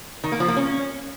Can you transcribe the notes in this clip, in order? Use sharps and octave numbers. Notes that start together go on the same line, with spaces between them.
D#3
A#3
F3
A#3
C#4